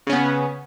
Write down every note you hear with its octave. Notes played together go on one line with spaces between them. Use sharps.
C#3 B3 C#4